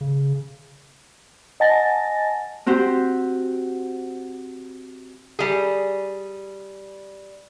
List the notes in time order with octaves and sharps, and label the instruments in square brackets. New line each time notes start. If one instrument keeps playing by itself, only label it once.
[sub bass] C#3
[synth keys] D#5 F#5 G#5 A5 A6 A#6
[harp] C4 F#4 G4 C5
[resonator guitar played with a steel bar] G3 G#4